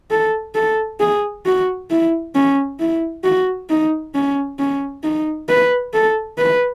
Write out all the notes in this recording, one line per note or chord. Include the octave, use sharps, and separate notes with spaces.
A4
A4
G#4
F#4
E4
C#4
E4
F#4
D#4
C#4
C#4
D#4
B4
A4
B4